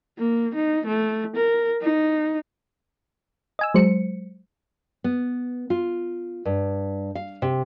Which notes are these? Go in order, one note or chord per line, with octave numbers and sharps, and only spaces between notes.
A#3
D#4
A3
A#4
D#4
D#5 G#5 E6
F#3 G#3 C5 C#7
B3
F4
G2
F5
C3